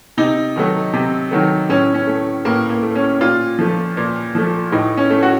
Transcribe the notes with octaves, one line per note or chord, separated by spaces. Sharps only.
C3 D#4
D#3 F#3 A3
C3
D#3 F#3 A3
A2 C#4
C#4
A3
A2 A#3
A#3
A3
C#4
A#2 F4
F3 A3
A#2
F3 A3
A2 D#4
C#4
A3
F#4